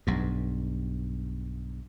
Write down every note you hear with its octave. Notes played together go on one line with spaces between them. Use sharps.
B1 G2